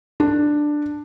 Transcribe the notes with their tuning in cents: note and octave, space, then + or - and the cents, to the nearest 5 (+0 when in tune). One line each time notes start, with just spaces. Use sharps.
D4 +10